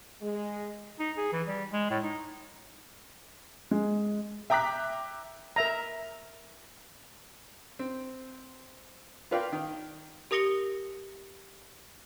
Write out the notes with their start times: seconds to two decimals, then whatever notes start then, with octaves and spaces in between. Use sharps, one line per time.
0.22 G#3
0.99 D#4
1.17 G#4
1.33 E3
1.47 G3
1.73 G#3
1.91 A2
2.04 D#4
3.71 G#3
4.50 E5 G5 A#5 D6 F#6 B6
5.56 A#4 E5 A#5
7.79 C4
9.31 F4 A#4 B4 D5 F5 G5
9.52 D#3
10.31 G4 A#4 D#6 A#6 C#7 G7